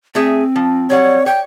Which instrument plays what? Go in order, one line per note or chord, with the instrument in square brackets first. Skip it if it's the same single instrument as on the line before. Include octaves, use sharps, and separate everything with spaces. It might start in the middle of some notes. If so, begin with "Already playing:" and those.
[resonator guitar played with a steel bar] A3 G#4 E5 [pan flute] C4
[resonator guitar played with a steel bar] F3
[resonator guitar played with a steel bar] F#3 G3 F#5 [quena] C#5
[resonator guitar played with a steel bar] C#5 [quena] G5